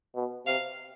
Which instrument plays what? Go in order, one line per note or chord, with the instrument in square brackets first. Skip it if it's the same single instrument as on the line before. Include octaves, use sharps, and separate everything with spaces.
[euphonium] B2
[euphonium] C3 [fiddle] F5